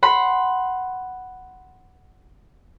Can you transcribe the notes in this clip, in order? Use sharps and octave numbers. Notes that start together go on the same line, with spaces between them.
F#5 B5 C6